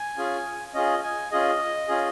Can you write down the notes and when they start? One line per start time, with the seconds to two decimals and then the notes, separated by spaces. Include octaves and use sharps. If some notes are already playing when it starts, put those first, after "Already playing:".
Already playing: G#5
0.17 C#4 F4 G#4
0.74 C#4 F4 G#4 D#5
1.03 G#5
1.32 C#4 F4 G#4 D#5
1.88 C#4 F4 G#4